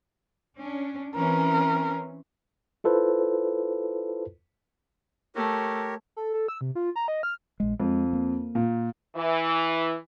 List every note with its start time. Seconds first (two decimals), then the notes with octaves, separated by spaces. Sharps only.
0.57 C#4 D4
1.15 E3 C4 C#4 A#4
2.84 E4 F4 A4 B4 C5
5.36 A3 G4 A#4 C#5
6.17 A4
6.34 A4
6.48 E6
6.61 C3
6.75 F4
6.96 A#5
7.08 D#5
7.23 F6
7.60 A#1 G#3
7.80 F2 G#3
8.13 A#3
8.55 A#2
9.16 E3